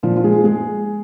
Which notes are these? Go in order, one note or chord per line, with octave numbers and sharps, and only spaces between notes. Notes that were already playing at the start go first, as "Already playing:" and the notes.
A#2 F3 F4
F4
G#3 G#4
G#3 G#4